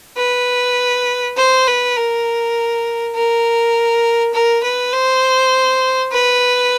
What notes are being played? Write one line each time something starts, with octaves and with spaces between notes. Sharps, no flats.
B4
C5
B4
A#4
A#4
A#4
B4
C5
B4